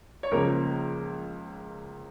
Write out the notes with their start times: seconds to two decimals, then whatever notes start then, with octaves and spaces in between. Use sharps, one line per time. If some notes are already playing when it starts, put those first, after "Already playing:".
0.23 C#5
0.31 C#2 C#3 F3 A#3 A#4